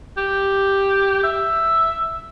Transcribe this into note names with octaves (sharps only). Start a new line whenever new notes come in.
G4
E5